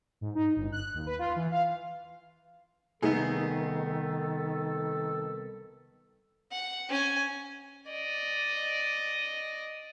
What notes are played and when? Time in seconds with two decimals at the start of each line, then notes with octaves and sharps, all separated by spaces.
0.21 G#2
0.35 D#4
0.56 G1
0.72 F#6
0.94 D#2
1.06 B4
1.19 F4
1.36 E3
1.51 F5
3.02 C2 D#3 A3 B3 D#4 G#4 A4
6.51 F#5
6.89 C#4 G#5
7.91 D5 D#5